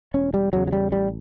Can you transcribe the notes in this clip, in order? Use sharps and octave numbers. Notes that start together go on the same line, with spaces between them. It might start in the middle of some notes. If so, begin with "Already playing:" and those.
E1 C#4
G3
E2 C#3 F#3
F#3
G3
A1 G3